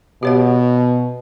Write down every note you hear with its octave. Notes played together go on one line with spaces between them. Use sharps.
B2 G4 C#5 F#5